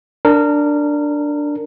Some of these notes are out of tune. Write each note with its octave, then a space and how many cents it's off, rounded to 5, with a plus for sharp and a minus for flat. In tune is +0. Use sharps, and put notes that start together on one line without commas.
D4 +0 A#4 -20